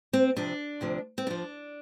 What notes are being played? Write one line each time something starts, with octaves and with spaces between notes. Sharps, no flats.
C4
F2 C3 F3 D4
D2 C3 F3
C4
F2 F3 D4